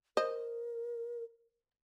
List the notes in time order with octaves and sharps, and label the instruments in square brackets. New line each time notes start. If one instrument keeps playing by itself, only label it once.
[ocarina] A#4 [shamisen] C5 D#5